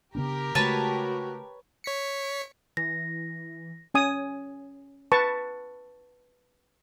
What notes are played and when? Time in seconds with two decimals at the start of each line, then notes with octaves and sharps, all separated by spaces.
0.15 C#3 B3 D4 G4 A#4
0.55 C#3 G#3 A3 F#4 B4 C#5 A5
1.84 C#5 B6 C#7
2.77 E3 A#6
3.94 C#4 G#5 D#6
5.12 B4 A5 C#6